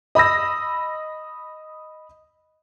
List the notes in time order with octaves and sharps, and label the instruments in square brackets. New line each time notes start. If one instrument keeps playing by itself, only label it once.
[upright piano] D#5 B5 D#6 E6 A#6